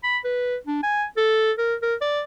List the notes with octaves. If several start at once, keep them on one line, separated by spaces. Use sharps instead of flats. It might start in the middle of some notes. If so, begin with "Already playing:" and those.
B5
B4
D4
G#5
A4
A#4
A#4
D5